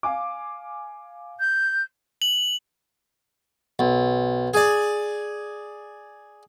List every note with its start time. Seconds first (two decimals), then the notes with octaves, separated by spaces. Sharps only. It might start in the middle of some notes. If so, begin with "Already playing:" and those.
0.03 F5 G#5 D6
1.40 G6
2.22 F#7
3.79 B1
4.54 G#4 D5